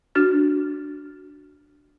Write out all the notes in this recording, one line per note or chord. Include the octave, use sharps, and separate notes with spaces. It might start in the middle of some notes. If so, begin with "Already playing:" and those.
D4 F#4 F6 A6